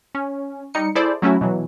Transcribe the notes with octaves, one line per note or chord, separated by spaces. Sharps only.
C#4
G3 D#4 C#7
E4 G#4 A4 C5 D5
F#3 A3 C#4 E4 F#4
B2 E3 F#3